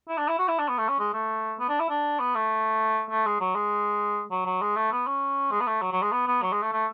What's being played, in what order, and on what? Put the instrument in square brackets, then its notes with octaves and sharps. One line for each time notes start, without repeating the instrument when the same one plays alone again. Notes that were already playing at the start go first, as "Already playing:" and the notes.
[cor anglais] E4
D4
E4
F#4
E4
D4
B3
A3
C#4
G#3
A3
B3
D4
E4
D4
B3
A3
A3
G#3
F#3
G#3
F#3
F#3
G#3
A3
B3
C#4
G#3
B3
A3
F#3
F#3
G#3
B3
B3
F#3
G#3
A3
A3